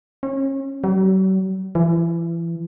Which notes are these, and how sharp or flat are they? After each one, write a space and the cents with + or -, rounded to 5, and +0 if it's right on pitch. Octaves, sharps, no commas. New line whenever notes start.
C#4 -35
F#3 +45
E3 +30